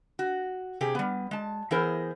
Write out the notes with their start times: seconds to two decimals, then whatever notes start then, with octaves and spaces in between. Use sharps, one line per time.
0.19 F#4
0.81 C3 G4 G#4
0.95 G3 B3
1.31 G#3 A5
1.71 E3 B3 E4 G#4 A#4 C5